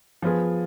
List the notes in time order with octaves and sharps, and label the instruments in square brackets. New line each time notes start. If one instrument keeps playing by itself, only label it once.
[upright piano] F3 B3 F4 G#4